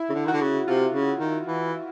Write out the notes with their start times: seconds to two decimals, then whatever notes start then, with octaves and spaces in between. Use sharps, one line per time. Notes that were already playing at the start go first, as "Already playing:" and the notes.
Already playing: E4
0.10 C#3
0.15 D3
0.26 D#3 F#4
0.33 D3
0.41 C#3
0.68 C3 F4
0.94 C#3
1.20 D#3
1.46 E3